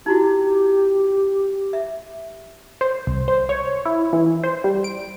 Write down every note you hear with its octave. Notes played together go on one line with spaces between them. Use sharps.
D#4 E4 F#4 G4
E5
C5
C2
C5
C#5
E4
E3
C5
G3
D7